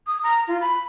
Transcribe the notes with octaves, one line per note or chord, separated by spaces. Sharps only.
D#6
A#5
F4
B5